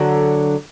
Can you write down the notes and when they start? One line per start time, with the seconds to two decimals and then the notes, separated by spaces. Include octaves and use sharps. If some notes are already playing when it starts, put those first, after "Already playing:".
Already playing: D3 F#3